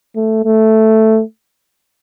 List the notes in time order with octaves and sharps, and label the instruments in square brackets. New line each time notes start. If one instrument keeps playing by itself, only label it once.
[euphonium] A3
A3